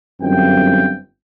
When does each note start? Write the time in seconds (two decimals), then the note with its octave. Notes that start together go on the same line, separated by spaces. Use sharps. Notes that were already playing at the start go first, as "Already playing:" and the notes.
0.21 G1 F#2 C4 G5